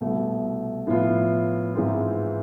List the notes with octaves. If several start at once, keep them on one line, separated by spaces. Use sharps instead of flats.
C2 B2 A3
A2 F3 B3 F4
G#2 E3 G#3 C4 F4